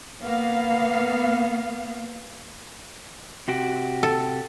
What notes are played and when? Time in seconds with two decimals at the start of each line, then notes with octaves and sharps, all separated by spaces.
0.23 A#3 B3 F5
3.48 C3 F#4 G4
4.03 A4